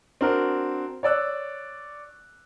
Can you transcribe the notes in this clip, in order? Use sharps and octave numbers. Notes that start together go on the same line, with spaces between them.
C4 D4 F#4 A#4
C#5 D5 E6 F#6